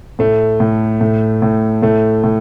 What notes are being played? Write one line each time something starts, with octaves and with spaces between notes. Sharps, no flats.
A2 A3
A2
A2
A2
A2 A3
A2